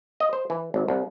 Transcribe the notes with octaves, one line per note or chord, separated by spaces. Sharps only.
D#5
C5
E3
G#1
C2